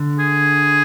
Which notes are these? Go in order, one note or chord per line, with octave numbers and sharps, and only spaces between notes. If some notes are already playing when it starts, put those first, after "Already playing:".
Already playing: D3
G#4